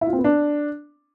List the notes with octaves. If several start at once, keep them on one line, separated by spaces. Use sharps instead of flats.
E4
F4
C4
B3
D4